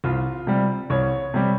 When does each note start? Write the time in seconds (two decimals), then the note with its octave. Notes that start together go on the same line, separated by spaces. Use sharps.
0.04 C2 F4
0.47 C3 G3
0.90 C2 C#5
1.34 C3 G3